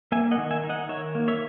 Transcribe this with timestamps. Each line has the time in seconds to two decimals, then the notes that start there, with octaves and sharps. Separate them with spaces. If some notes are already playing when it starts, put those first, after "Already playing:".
0.12 A#3 E5 G#5
0.31 D#5 F#5
0.38 D#3
0.51 E5 G#5
0.63 D#4
0.69 D#5 F#5
0.89 D#3 C#5 E5
1.15 A#3
1.28 C#5 E5